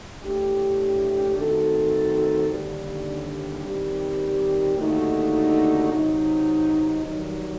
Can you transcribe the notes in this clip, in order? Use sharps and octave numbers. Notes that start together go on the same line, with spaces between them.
A2 A3 D4 G4
D#3 A3 C4 F#4 A4
D#2 D3 G3
D#3 G3 C4 G4
D#2 D3 A3 D#4 F#4
C3 F#3 C4 D#4
G2 D#3 F#3